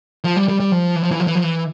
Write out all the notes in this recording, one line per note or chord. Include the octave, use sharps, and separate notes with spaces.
F3
G3
G3
G3
F3
E3
F3
E3
F3
E3
F3
E3